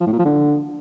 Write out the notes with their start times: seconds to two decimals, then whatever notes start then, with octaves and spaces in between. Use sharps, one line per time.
0.01 F3
0.07 A2
0.13 A#2
0.19 F3
0.25 D3